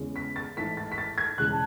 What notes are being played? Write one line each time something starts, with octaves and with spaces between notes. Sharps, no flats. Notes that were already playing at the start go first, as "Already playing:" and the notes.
Already playing: E2 C#3 G#3 C#4
B6
A6
A1 G#2 E3 A3 B6
A6
B6
A6
G#6
E1 E2 C#3 G#3 F#6
A5